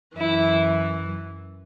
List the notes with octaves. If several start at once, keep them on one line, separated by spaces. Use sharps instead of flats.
F#2 E3 E4